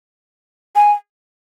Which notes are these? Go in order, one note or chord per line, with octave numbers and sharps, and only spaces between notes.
G#5